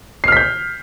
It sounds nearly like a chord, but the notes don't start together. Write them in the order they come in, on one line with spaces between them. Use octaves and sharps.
C7 F6 B6 G6